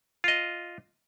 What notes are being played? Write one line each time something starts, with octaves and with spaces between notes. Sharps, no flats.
F4 D#5